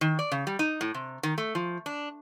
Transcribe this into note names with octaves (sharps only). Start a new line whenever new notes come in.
D#3
D5
C#3
G3
D#4
A2
C3
D#3
A3
F3
D4